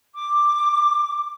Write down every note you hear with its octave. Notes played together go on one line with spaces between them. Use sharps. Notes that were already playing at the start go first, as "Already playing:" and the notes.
D6